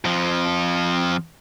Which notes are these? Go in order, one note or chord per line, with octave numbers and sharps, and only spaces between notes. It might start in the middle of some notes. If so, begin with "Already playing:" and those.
F2 F3